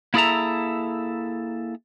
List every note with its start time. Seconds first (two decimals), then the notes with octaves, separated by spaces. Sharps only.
0.14 A#3 E4 G#4 A4 E5 A#5